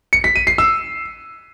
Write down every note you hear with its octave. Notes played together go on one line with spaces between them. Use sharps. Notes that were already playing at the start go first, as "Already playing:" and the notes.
C#7
B6
D#7
C7
E6